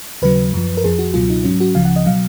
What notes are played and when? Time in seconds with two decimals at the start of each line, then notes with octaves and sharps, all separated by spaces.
0.22 D#2 C#3 F#3 B4
0.54 F#2 F3
0.77 A#4
0.84 F2 F3 G#4
0.99 F#4
1.14 C#2 B2 F#3 F4
1.30 D#4
1.44 G#2 F#3 C#4
1.60 F#4
1.75 C#2 C#3 F3 F5
1.85 F#5
1.96 D#5
2.06 B2 F#3 F5